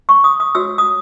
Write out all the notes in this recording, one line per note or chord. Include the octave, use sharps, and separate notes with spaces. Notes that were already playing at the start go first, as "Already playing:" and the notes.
C#6
D#6
D#6
F#4 C#5 E6
D#6